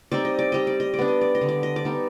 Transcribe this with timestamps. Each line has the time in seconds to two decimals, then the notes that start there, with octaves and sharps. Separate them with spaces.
0.12 G3 C4 D#4 D5
0.25 D#5
0.39 D5
0.52 G3 D#5
0.67 D5
0.80 D#5
0.94 D5
0.99 B3 D4
1.08 D#5
1.21 D5
1.35 D#5
1.41 D3
1.49 D5
1.63 D#5
1.76 D5
1.85 G3 B3 D#4